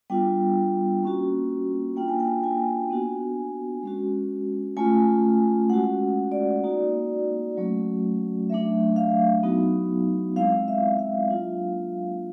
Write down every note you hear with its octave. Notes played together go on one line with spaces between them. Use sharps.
G3 B3 D4 F4 G5
A#3 C#4 F#4
A#3 D4 F4 G5
G#5
G5
G#5
B3 D4 F#4
G#3 C#4 F#4
A3 C#4 F4 G#5
G#3 C#4 F#4 F#5
D5
A#3 D#4 F#4
F#3 A3 C#4 F#4
F#3 A3 D4 E5
F5
F#3 B3 D#4 F#4
G#3 C4 E4 F5
E5
F5
F#3 A#3 D4 F4